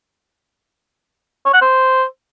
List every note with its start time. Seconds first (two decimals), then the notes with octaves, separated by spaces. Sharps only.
1.45 C#5
1.53 F#5
1.62 C5